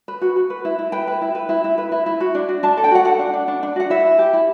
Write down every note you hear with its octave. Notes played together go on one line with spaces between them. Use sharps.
B4
F#4
F#4
B4
E4
E4
B4 G5
B4
E4
B4
E4
E4
B4
E4
E4
F#4
D4
F#4
D4 A5
A4
G5
F#4 F#5
A4 F#5
D4
D4
D4
D4
F#4 F#5
E4 E5
E4
G4
E4